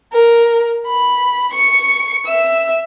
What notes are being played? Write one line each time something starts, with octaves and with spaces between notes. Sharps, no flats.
A#4
B5
C#6 C#7
E5 E6